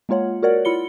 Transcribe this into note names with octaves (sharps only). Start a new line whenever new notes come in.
G#3 A#3 F4 C#5 F#5
F#4 A#4 C#5 D5 F#5
E4 F4 B5 C#7 G7